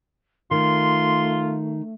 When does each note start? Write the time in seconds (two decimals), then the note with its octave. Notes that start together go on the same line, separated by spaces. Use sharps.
0.51 D#3 A3 F4 C6